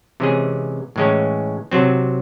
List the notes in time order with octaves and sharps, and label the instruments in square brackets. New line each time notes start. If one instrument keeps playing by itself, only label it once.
[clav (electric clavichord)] C3 E3 G#3 C#4 G#4
A2 E3 G#3 C#4
C3 F#3 C4